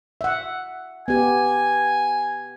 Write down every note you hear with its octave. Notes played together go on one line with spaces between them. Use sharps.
E5 F#5
B3 G4 G#5